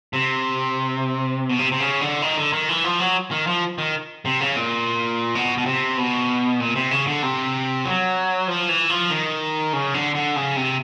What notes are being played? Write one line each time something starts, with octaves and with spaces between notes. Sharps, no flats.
C3
B2
C3
C3
C#3
D3
D#3
D3
D#3
E3
F3
F#3
D#3
F3
D#3
C3
C#3
A#2
B2
B2
C3
B2
A#2
C3
C#3
D3
C3
F#3
F3
E3
F3
D#3
C#3
D3
D3
C#3
C3